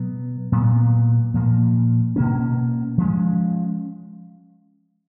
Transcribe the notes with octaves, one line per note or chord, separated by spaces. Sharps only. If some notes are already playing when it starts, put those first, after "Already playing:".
Already playing: B2 F#3 B3
A#2 F#3 B3
A#2 F3 A#3
B2 A#3 C#4
F3 G#3 C#4